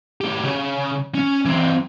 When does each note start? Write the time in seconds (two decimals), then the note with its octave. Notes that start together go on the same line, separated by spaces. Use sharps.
0.21 A2 G4
0.44 C#3
1.14 C#4
1.45 E3 C4